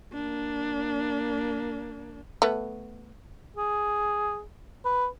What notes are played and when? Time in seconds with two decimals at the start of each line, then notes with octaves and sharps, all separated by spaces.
0.12 A#3 D4
2.42 A3 B3
3.57 G#4
4.85 B4